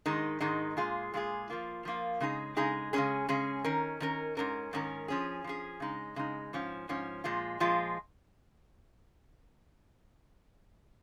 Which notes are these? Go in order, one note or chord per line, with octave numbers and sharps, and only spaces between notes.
G#2 D#3 G#3 D#4
G#2 D#3 G#3 D#4
A#2 G#3 F4 G#4
A#2 G#3 F4 G#4
F3 A#3 F4
F3 A#3 F4
C#3 G#3 D#4 G#4
C#3 G#3 D#4 G#4
C#3 G#3 C#4 G#4
C#3 G#3 C#4 G#4
D#3 C#4 A#4
D#3 C#4 A#4
G#2 D#3 C#4 A#4
G#2 D#3 C#4 A#4
F3 C#4 G#4
F3 C#4 G#4
C#3 G#3 D#4
C#3 G#3 D#4
G#2 F3 C#4
G#2 F3 C#4
A#2 F3 G#3 F4
A#2 F3 G#3 F4